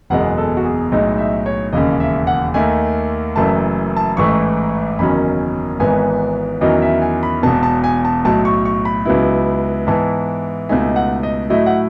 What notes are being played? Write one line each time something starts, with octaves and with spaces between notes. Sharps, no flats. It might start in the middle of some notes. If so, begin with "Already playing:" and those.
F#1 E2 B2 G#3 F#5
A4
F#4
G#4
B1 A2 G#3 D#4
E5
C#5
E1 D#2 C#3 D#5
E5
F#5
D#2 D#3 A3 G#5
F#1 F#2 E3 A3 A5
A5
A1 G#2 E3 A3 E4 C#6
F#1 E2 D#3 F#3 C#4 B5
G#1 G#2 E3 B3 G#5
E2 D#3 F#3 C#4 E4 D#5
E5
G#5
B5
E1 E2 B2 A5
A5
G#5
A5
B1 A2 F#3 A5
C#6
C#6
B5
C#2 C#3 F#3 B3 E4
G#2 E3 B3 E4 A5
C#2 B2 A3 D#4 G#5
F#5
D#5
A2 F#3 A3 E4 D#5
F#5